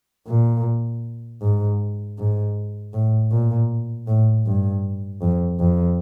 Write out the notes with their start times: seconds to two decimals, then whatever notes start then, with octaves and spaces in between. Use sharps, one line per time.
0.28 A#2
1.41 G#2
2.18 G#2
2.94 A2
3.32 A#2
4.08 A2
4.46 G2
5.22 F2
5.60 F2